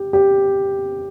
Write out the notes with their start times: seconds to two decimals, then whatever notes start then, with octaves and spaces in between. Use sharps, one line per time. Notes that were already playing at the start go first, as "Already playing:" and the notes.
Already playing: G4
0.13 G4